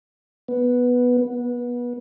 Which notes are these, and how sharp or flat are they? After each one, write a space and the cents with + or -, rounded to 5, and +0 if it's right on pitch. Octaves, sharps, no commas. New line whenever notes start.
B3 -5
B3 -25